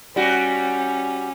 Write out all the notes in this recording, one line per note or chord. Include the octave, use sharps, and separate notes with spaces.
G3 C#4 F#4